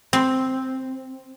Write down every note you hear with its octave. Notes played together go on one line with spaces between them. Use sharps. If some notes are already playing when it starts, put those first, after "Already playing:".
C4